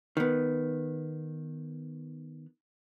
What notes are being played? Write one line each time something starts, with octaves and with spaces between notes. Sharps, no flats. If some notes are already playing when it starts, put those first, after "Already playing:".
D#3 B3